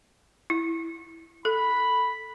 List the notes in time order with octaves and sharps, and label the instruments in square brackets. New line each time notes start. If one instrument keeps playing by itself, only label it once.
[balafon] E4
[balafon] A4 [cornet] B5